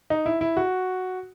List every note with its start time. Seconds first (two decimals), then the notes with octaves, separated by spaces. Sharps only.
0.10 D#4
0.26 E4
0.41 E4
0.57 F#4